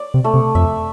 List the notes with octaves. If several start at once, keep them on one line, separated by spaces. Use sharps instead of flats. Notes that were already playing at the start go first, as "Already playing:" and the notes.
Already playing: D5
C3
A3
C3
F2 E5